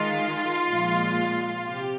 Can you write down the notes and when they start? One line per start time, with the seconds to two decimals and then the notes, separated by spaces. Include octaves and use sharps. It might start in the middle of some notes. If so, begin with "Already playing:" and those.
Already playing: D#3 G#3 F4
0.69 A#2 F3 G#3
1.67 C3 G4